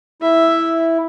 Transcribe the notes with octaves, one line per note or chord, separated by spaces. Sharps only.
E4 E5